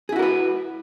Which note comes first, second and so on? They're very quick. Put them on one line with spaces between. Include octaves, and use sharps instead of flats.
G#4 E4 F#4 A#4 B4